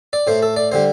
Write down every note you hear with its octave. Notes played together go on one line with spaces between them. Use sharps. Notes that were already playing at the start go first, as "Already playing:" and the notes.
D5
A2 A3 C5
A4
D5
D3 G3 C5